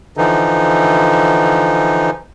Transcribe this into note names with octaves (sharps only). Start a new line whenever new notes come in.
D3 E3 F3 D#4